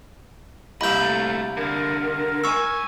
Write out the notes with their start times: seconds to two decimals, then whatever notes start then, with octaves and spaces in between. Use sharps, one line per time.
0.81 C2 A#3 D#5 E5 B5 G6
1.00 D2 A3
1.57 D3 A#4
2.44 G#2 G#5 C#6 E6